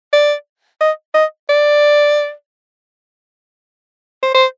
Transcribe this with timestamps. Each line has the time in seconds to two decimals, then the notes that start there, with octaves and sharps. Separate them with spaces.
0.13 D5
0.81 D#5
1.14 D#5
1.49 D5
4.23 C5
4.35 C5